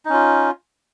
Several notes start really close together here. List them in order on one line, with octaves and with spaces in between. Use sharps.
D#4 C#4 F4